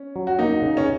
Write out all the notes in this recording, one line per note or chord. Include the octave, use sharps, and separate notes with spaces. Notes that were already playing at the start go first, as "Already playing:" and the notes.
Already playing: C#4
F#3
F#4
A#3 D#4
C#3
C#4